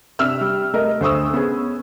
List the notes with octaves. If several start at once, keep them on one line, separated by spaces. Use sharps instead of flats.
C3 D4 E5 E6 F6
G3
A3 A#4 D#5
D2 C5 C#6 D#6 E6
B3 C#4 G#4